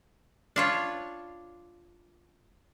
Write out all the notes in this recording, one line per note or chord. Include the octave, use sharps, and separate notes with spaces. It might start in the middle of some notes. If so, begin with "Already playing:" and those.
D4 F4 C#5